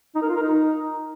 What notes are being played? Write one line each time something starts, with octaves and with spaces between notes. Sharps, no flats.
D#4
A#4
F4
A#4
D#4